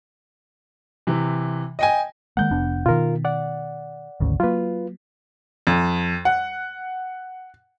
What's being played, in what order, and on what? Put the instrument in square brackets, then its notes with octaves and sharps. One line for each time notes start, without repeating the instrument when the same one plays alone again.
[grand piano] C3 E3
D#5 G5 G#5
[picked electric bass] D#3 G#3 A#3 [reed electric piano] F#5 G6
[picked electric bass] F1 B3 D4
[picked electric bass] B2 D#3 [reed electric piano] F4 A#4
[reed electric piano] D5 F#5
[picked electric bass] G#1 D2 C#3
[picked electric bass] F#3 A#3 [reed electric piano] F4 B4
[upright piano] F2
F#5